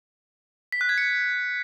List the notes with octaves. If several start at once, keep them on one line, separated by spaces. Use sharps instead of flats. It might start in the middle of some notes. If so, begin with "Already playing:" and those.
B6
F#6
G#6
C#7